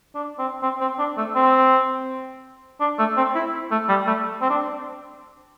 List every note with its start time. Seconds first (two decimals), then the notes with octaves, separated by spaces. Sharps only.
0.15 D4
0.39 C4
0.62 C4
0.81 C4
0.99 D4
1.17 A3
1.35 C4
2.80 D4
2.99 A3
3.17 C4
3.35 E4
3.71 A3
3.89 G3
4.07 A3
4.42 C4
4.50 D4